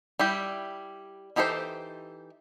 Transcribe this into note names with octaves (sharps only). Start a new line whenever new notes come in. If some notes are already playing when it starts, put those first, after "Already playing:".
G3 E4 G4
E3 D#4 G4 A4 C5